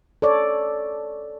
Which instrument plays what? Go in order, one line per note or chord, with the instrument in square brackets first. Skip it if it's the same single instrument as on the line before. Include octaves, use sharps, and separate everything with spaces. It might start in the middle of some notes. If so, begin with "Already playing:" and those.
[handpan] A4 C#5 D5